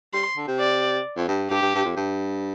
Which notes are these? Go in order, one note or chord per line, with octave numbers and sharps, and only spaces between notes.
G3 C6
D3
C3
D5
F2
G2
G2 G4
G2
G2
F2
G2